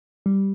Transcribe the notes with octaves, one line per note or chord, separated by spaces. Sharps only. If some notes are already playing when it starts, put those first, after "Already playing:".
G3